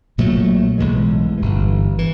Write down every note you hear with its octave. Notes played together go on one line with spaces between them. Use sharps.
B1 A#2 F#3 A3
B1 A2 E3 G#3
G1 G2 E3
E3